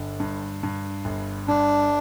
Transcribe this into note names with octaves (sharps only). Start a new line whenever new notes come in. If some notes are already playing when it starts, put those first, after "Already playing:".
Already playing: G1 D3
G2
G2
G1
G2 D4